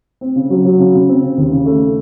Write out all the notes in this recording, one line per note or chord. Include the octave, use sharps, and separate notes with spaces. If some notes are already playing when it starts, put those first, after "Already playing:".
C4
C#3
F#3
F#3
C#3
C#3
C4
C#3
D#2
C#3
A3